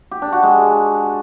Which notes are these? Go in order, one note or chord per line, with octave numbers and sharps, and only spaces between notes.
G4
D4
F#4
G#3